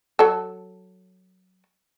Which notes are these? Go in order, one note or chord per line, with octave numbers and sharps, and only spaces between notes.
F#3 A4